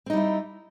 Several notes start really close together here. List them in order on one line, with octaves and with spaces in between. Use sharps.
C4 D#4 G3 E4